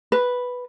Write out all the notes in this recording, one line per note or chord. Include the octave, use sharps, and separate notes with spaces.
B4